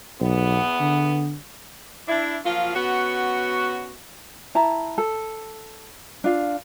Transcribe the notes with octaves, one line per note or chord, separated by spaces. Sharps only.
B1 E2 B3
D3
D4 E4
F3 F#3 A#3 F4
B3 C#4 F#4
E4 A5 A#5
A4
D4 F4 F5